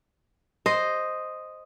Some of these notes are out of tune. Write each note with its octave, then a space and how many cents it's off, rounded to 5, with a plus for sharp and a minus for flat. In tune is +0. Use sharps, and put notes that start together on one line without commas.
C5 +0 D#5 +0